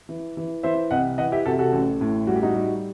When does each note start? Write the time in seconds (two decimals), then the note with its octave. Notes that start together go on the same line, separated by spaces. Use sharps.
0.09 E3
0.37 E3
0.63 E3 C5 E5
0.91 C2 D#5 F#5
1.18 E3 D#5 F#5
1.32 E4 G4
1.46 C3 F#4 A4
1.59 F#4 A4
1.73 A1
2.01 A2
2.27 G3 F#4
2.35 G4
2.43 D#4 F#4
2.54 G3